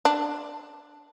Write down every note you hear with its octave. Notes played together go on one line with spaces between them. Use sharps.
D4